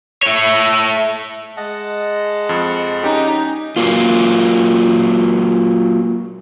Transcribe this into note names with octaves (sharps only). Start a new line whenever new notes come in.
A3 C#5
G#3 D#5 F#5 A5
F2
C#4 D#4 G4
F#3 A#3 F4